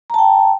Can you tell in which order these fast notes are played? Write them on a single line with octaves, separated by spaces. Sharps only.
A#5 A5 G5